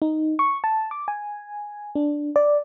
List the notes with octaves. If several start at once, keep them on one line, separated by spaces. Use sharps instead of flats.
D#4
C#6
A5
D6
G#5
D4
D5